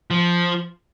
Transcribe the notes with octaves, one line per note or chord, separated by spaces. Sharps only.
F3